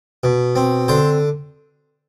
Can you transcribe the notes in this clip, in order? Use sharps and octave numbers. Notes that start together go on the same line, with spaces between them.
B2
C4
D3 C5